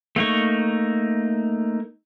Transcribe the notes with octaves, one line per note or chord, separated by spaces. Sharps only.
A3 A#3 D#4 C#6